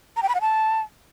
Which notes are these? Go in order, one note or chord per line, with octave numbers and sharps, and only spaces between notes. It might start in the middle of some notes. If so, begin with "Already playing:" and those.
A#5
G5
B5
F#5
A5